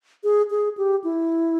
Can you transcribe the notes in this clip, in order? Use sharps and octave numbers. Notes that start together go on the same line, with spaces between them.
G#4
G#4
G4
E4